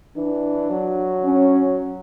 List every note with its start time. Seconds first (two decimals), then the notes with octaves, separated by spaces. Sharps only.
0.17 E3 D4
0.70 F#3
1.24 C#4